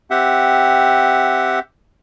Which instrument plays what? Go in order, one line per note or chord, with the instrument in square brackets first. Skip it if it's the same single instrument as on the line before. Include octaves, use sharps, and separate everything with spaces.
[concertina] C4 G4 E5 F#5